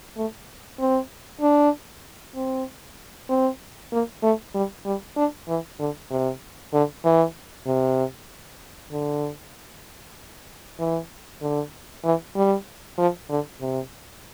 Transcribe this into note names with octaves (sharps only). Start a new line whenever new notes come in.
A3
C4
D4
C4
C4
A#3
A3
G3
G3
D4
E3
D3
C3
D3
E3
C3
D3
E3
D3
E3
G3
F3
D3
C3